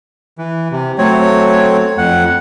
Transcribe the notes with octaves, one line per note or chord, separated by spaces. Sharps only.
E3
C3
F#3 A3 C4 C#5
F2 F#5